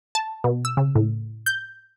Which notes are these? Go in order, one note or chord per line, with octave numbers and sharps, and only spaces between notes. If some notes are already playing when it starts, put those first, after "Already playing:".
A5
B2
E6
C#3
A2
G6